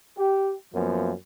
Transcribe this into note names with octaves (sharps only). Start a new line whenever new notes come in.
G4
F#2 F3 A#3 B3